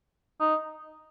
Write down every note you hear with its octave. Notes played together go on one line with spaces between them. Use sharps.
D#4